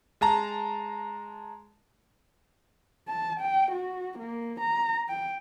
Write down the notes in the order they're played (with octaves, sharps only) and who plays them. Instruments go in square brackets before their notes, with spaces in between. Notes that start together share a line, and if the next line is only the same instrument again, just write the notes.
[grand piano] G#3 A5 A#5
[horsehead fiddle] A5
G5
F#4
A#3
A#5
G5